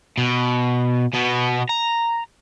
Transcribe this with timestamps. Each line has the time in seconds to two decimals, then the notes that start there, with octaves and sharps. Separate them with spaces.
0.18 B2
1.14 B2 B3
1.69 A#5